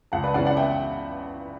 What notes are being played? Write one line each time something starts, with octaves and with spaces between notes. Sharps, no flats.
C#2 F#5 A5
B4 D5
C#3 E3 B3 D5 F#5
D5 F#5
E5 G5